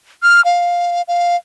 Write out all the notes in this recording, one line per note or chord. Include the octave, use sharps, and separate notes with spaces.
F6
F5
F5